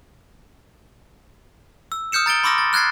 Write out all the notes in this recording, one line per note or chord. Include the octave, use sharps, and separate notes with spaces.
E6
D#6 F6 G6 C#7 E7
A#5 A6 D7 G7
B5 C6 D6 E6 F6 A#6
A6
F6 F#6 G#6 A6 C7